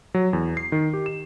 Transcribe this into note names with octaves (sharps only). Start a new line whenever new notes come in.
F#3
E2
C7
D#3
G4
E7